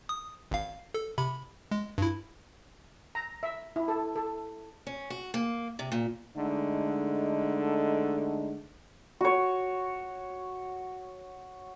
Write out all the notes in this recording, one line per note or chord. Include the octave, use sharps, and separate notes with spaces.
D#6
G#1 F5
A4
C3 B5
G#3
G2 E4
A#5
E5
E4
A4
A4
C#4
F#4
A#3
C3
A#2
D3 G#3 A3 D#4
F#4 C#5